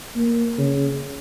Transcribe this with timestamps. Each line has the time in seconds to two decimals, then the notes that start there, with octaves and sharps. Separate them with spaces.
0.16 A#3
0.58 C#3